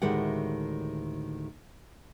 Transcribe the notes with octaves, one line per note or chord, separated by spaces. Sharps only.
D2 A2 D#3 G#3 G4 F#5